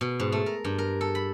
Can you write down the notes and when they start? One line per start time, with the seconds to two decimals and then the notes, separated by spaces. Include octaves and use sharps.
0.01 B2
0.20 G#2
0.32 A3
0.46 A#4
0.65 G2
0.78 A#4
1.01 A4
1.15 B5